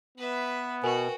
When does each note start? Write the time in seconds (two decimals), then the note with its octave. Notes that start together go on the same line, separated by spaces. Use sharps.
0.17 B3 B4 E5
0.83 B2 F#4 A#4 B4 G5 G#5